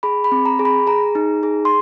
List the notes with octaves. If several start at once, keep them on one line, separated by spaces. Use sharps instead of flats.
G#4 B5
B5
C4
A#5
G#4
B5
G#4 A#5
D#4
G#4
C6